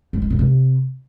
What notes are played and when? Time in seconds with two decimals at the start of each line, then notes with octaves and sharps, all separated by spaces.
0.13 A2
0.22 G#3
0.30 B2
0.39 C3